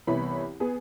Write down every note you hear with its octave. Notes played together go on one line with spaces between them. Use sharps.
C2 E3 B3 E4 C#5 B5
B3 G#4